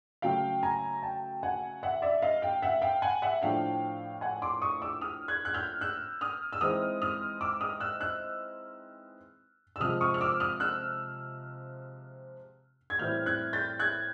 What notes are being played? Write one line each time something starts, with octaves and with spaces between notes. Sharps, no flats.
C#3 F#3 A3 F5 G5
G#5 A#5
G5 A5
F#5 G#5
E5 F#5
D5 E5
D#5 F5
F5 G5
E5 F#5
F5 G5
F#5 G#5
E5 F#5
A2 F3 A3 D4 F5 G5
F#5 G#5
C6 D6
C#6 D#6
D6 E6
D#6 F6
F#6 G#6
F#6
F6 G6
E6 F#6
D#6 F6
E6
E3 G#3 C4 D#4 D#6 F6
D#6 F6
D6 E6
D#6 F6
E6 F#6
E6 F#6
E6
C3 F3 G#3 D#6 F6
C#6 D#6
F6
D6 E6
D#6 F6
E6 F#6
G#6
A2 E3 G3 C4 E4 F6 G6
F#6 G#6
G6 A6
F#6 G#6